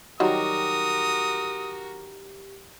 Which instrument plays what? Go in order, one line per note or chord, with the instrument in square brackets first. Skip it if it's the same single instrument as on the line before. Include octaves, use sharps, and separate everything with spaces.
[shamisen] D#3 F#3 G3 [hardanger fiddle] F#4 A#4 [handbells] G4 [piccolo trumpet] D#6